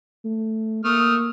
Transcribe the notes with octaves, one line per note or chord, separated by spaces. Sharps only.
A3
A3 A#3 D#6 F6